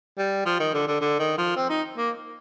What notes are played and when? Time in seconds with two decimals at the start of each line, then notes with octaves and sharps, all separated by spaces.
0.18 G3
0.46 F3
0.60 D#3
0.74 D3
0.87 D3
1.01 D3
1.19 D#3
1.38 F3
1.56 C4
1.70 D#4
1.98 A#3